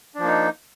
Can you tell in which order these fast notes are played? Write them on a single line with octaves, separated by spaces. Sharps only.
D4 F3 A#3 D#4